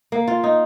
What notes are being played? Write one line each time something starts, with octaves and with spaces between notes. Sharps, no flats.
A#3
F4
D#4